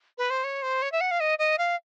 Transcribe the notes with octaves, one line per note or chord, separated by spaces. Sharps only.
B4
C5
C#5
C5
C#5
E5
F#5
F5
D#5
D#5
F5